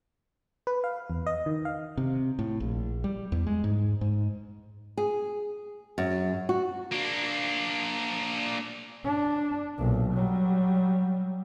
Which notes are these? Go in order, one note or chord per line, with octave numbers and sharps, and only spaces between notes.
B4
F5
E2
D#5
D#3
F5
C3
A2
A#1
G3
E2
G#3
G#2
G#2
G#4
F#2
F#4
A#3 D4
D4
B1 A#2
F#3 G3